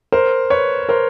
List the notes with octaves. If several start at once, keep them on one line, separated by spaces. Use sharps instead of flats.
A#4 C5
B4 C#5
A#4 C5